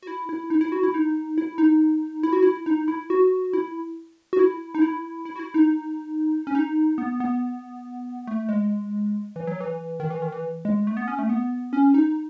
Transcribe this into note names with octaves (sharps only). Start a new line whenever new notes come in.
F#4
E4
E4
D#4
E4
F#4
E4
D#4
E4
D#4
E4
F#4
E4
D#4
E4
F#4
E4
F#4
E4
D#4
E4
E4
F#4
E4
D#4
C#4
D#4
B3
B3
A3
G#3
E3
F#3
E3
D#3
E3
D#3
E3
G#3
A3
B3
C#4
A3
B3
C#4
D#4